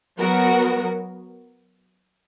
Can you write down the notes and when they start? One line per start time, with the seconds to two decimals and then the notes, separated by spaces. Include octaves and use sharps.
0.19 F#3 B3 F#4 A#4